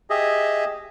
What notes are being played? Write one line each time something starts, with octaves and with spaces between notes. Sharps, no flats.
G4 G#4 D#5 E5